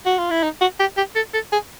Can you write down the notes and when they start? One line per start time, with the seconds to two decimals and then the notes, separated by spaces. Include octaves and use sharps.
0.06 F#4
0.18 F4
0.30 E4
0.43 D#4
0.61 F#4
0.80 G4
0.97 G4
1.15 A4
1.34 A4
1.52 G#4